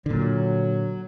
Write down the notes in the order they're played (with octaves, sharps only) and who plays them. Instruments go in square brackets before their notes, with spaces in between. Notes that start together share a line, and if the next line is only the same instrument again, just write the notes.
[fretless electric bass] A#2 D3 [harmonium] F#3